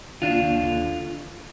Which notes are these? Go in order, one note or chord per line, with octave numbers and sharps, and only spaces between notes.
D#2 D4 F4
D#2
D3